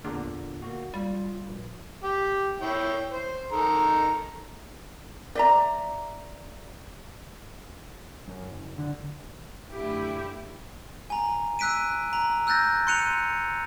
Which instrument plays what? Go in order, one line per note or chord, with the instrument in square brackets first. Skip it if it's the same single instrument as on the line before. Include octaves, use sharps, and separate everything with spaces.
[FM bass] E2 [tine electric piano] A#2 D3
[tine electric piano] A#3 F#4
[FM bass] G3 [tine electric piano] F4
[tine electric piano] A#1
[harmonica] G4
E4 C#5 G5
C5
D#3 A4 A#5
[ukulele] D5 E5 A#5
[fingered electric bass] F#2
F#1
D3
[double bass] F#2 [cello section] D3 A3 E4 [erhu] G4
[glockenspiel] G#5 A#5
E6 F#6 B6 D7 D#7
A#5
E6 F#6 G6 A6 A#6
C6 F#6 C#7 D#7 F7